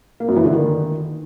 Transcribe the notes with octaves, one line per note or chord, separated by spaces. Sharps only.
A#3
F#2
E3
D3
D#3